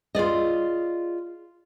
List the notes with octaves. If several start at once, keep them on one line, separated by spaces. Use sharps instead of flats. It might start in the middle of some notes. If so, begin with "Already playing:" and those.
F4 G#4 D5 D#5